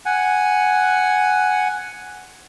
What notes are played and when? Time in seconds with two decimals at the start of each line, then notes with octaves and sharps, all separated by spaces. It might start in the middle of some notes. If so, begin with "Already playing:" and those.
0.06 F#5 G#5